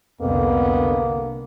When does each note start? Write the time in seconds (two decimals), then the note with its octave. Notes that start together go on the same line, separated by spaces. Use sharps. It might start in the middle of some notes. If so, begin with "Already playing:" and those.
0.21 C2 F2 D3 A#3 B3